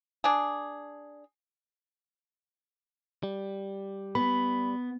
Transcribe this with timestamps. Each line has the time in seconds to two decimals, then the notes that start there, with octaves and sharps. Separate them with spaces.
0.24 D4 G#4
3.23 G3
4.15 B3 B5